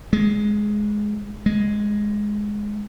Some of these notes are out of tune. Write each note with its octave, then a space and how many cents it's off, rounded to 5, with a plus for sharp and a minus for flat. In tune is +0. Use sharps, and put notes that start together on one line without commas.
G#3 +10
G#3 +0